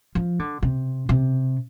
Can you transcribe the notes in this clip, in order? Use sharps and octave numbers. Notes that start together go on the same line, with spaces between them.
F3
D3
C3
C3